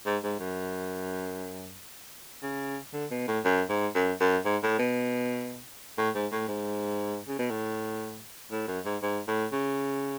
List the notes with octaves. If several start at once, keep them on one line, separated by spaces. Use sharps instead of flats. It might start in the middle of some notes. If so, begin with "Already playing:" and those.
G#2
G#2
F#2
C#3
D3
B2
A2
F#2
G#2
F#2
F#2
G#2
A2
B2
A2
G#2
A2
G#2
C#3
B2
A2
A2
F#2
G#2
G#2
A2
C#3